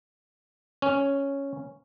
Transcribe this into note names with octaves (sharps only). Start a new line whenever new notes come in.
C#4